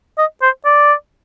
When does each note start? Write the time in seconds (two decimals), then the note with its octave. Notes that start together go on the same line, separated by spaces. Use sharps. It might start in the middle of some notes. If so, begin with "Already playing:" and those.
0.18 D#5
0.42 C5
0.65 D5